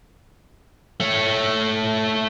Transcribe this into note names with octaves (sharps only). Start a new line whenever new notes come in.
A3 C#5